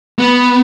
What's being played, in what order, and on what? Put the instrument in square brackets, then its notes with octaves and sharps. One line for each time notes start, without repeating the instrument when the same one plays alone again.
[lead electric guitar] B3